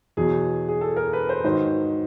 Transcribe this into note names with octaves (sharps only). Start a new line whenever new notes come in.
E2 B2 F#3 G#4
G#4
A4
A#4
B4
C5
G#2 D#3 F#3 C5